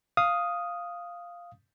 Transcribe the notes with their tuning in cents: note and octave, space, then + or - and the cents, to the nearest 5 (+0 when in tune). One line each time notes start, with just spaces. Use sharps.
F5 +0 D#6 +0